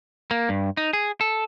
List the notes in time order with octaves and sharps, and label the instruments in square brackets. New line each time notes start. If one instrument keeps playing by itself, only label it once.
[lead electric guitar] A#3
G2
D#4
G#4
A4